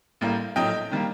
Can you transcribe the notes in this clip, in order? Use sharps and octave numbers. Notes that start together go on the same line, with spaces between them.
A1 A2 G3 A#3
A#1 A2 F#3 A3 D#5 G5
D#3 G3 A#3